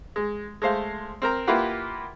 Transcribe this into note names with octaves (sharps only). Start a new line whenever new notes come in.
G#3
G#3 A3 C5 F5
C4 A#4 A#5
A#3 E4 F4 G4 B4 F#5